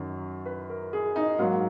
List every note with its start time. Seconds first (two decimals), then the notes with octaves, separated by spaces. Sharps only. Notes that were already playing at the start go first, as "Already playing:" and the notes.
Already playing: F#2 D#3 F#3
0.46 B4
0.70 A#4
0.93 G#4
1.16 D#4
1.39 G#2 F#3 A#3